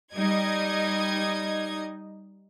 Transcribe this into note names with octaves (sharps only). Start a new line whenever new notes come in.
G3 D#4 D#5 G#6